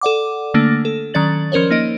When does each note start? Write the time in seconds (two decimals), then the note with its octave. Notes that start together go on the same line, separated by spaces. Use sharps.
0.01 A4 D5 F#5 D6
0.54 D3 A3 A#3 D4
0.85 A4
1.14 D#3 F#3 C#4 D5 A6 F#7
1.52 F3 C#4 A#4 C5 C#5
1.70 A#3 D#4 D#5 D7